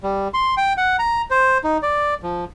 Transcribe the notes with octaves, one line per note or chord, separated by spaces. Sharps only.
G3
C6
G5
F#5
A#5
C5
D#4
D5
F3